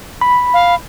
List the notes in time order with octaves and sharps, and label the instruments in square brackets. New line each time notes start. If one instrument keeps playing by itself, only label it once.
[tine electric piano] B5
[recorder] F5